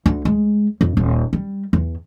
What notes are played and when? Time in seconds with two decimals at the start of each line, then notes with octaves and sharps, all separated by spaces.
0.06 D2
0.25 G#3
0.81 F2
0.97 D#1
1.33 G3
1.73 E2